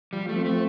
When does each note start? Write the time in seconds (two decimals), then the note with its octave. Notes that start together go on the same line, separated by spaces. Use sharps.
0.13 F3 G3
0.29 A3
0.35 C4
0.45 A3